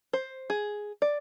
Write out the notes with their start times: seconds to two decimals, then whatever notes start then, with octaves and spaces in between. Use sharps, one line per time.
0.13 C5
0.50 G#4
1.02 D5